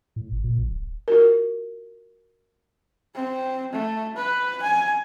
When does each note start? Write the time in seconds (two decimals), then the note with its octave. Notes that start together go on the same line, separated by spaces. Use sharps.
0.16 A2
0.32 G1
0.44 A#2
0.59 A#1
0.71 D1
1.08 F4 F#4 A#4
3.15 C4
3.73 A3
4.16 B4
4.62 G#5